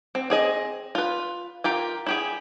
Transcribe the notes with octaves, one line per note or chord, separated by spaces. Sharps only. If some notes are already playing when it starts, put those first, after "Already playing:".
C4
C4 G#4 D#5
F4 B4
F4 G4 A#4
E4 G4 G#4